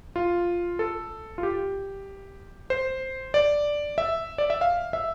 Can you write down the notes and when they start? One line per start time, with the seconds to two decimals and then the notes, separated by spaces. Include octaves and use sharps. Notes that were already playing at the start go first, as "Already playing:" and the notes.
0.16 F4
0.79 A4
1.38 F4
1.43 G4
2.70 C5
3.34 D5
3.98 E5
4.38 D5
4.50 E5
4.61 F5
4.93 E5